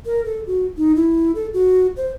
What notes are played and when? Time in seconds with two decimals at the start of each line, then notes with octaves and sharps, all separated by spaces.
0.06 A#4
0.25 A4
0.47 F#4
0.78 D#4
0.96 E4
1.35 A4
1.54 F#4
1.97 C5